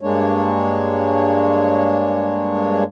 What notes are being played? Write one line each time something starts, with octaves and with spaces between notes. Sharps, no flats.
G2 G#3 A#3 D4 C#5